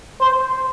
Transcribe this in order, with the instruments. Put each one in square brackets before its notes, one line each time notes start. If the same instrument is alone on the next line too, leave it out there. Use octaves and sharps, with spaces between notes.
[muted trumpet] C5